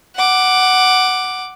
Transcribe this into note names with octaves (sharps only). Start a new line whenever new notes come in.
F#5 D6